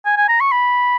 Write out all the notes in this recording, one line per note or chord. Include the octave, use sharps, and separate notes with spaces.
G#5
G#5
A#5
C#6
B5